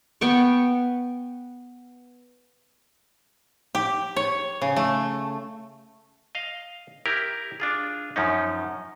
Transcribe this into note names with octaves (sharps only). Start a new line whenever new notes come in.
B3 G5 C#6
G4
C#5
C#3
A3
D#5 F5
E4 G4 A#4
D4 F4 G#4
F#2 F3 C#4 D#4